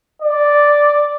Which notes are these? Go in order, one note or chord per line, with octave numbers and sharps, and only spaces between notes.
D5